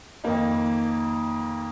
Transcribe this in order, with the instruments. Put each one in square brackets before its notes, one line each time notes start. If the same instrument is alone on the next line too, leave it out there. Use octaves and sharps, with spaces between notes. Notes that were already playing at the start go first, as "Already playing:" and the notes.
[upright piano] F2 D#3 A#3 D#4